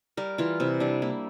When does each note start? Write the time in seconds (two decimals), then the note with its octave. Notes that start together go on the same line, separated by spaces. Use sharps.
0.17 G3 A#4
0.38 E3 F4
0.60 C3 E4
0.80 G3 D4
1.02 A#3 E4